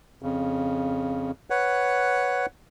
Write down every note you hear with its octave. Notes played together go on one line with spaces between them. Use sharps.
F2 C#3
B4 C#5 F#5